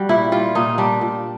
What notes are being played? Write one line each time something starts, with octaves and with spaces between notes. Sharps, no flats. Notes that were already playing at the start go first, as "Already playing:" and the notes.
Already playing: G3 F#4
A#2 E4
G3 F4
A#2 D#4
G3 D4
A#2